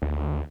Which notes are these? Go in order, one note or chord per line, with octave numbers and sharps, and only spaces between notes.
D2